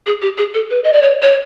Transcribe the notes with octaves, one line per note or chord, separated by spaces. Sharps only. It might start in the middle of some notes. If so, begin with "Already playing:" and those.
G#4
G4
G#4
A4
B4
D#5
D5
C#5
C#5